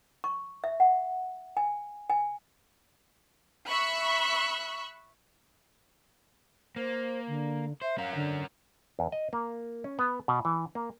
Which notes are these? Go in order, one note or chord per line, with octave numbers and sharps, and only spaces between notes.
C#6
E5
F#5
G#5
G#5
E5 B5 C#6 E6 F#6
A#3 C5
D3
C5 E5
C#4 A#4 F5
D3
E2
D#5
A#3
C#4
B3
B2
E3
A#3